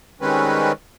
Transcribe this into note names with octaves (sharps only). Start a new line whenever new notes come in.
D#3 G3 G#3 C4 C#4 B4